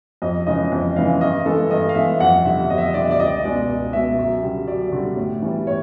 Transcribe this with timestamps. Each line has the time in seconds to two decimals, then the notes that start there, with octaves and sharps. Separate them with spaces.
0.22 F2 D#5
0.47 C#3 E3 G#3 D#5
0.72 F2
0.96 C#3 E3 G#3 F5
1.21 G2 D#5
1.46 E3 G#3 A4
1.71 G2 D#5
1.89 F5
1.95 E3 G#3 E5
2.20 F2 F#5
2.45 D3 G3 E5
2.70 F2 D#5
2.78 E5
2.86 D#5
2.94 D3 G3 D5
3.03 D#5
3.11 D5
3.19 C#2 D#5
3.28 D5
3.37 D#5
3.44 B2 G#3 D5
3.69 C#2
3.93 B2 G#3 E5
4.19 F#2
4.42 D3 G3
4.67 F#2 D5
4.92 D3 G3
5.17 A2
5.42 E3 G3
5.67 A2 C#5